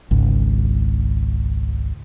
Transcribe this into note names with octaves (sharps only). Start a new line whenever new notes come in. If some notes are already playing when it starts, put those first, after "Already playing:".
G#1 C#2